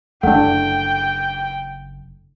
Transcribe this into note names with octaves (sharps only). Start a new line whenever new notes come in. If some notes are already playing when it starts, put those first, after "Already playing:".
F#1 A3 D4 F#5 G5